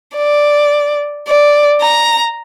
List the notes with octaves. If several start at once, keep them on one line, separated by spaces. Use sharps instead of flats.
D5
D5
A#5